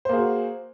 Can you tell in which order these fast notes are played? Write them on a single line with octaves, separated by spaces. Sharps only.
C5 A#3 G#4 F#4